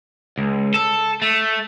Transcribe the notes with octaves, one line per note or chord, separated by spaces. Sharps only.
C#2
A4
A3